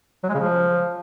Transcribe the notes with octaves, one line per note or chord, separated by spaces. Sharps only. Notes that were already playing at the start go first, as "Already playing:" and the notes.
F#3
G#3
C#3
F3